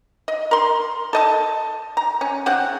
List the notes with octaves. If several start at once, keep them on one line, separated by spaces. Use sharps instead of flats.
D#5
A#4 C6
A4 D#5 A5
A#5
C#4
C#3 C4 F#5